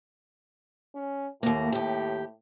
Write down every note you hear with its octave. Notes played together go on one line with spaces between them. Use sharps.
C#4
D#2 A2 A#3
D#2 G4